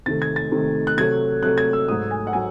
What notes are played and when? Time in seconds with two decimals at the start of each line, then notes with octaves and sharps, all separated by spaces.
0.06 C3 D#3 A3 A6
0.22 G#6
0.36 A6
0.52 C3 D#3 A3
0.87 F#6
0.98 C3 F#3 A3 G#6
1.43 C3 F#3 A3 F#6
1.58 G#6
1.73 E6
1.88 G#2 F#3 A3 D#6
2.11 G#5
2.27 F#5
2.33 F#3 A3 G#5